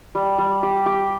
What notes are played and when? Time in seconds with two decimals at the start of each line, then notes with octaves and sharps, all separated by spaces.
0.15 G3
0.38 G3
0.63 G4
0.86 G4